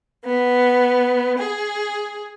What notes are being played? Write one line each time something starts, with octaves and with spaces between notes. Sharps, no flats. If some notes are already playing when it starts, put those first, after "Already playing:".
B3
G#4